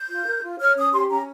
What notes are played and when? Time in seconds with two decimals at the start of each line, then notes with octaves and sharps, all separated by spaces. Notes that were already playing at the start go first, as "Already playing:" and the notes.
Already playing: G6
0.10 F4
0.26 A#4
0.42 F4
0.59 C#5 F6
0.76 C#4 D#6
0.93 G4 C6
1.09 C#4 A#5